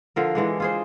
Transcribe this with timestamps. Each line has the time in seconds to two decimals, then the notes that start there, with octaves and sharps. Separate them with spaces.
0.16 D3 F3 A#4
0.35 E3 G#3 D4
0.60 F4 G#4 C5